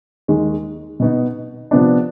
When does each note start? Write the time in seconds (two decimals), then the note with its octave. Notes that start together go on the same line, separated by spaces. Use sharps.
0.28 D#2 D#3 G#3
1.00 B2 B3 D#4
1.71 C3 F3 B3 D4